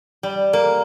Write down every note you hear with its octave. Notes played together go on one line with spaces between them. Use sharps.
G3
A#3